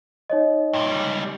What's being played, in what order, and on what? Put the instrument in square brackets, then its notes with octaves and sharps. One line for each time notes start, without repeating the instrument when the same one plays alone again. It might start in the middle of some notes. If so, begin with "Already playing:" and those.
[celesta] D#4 C#5 D#5
[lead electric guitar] G2 A#2
C#2 G3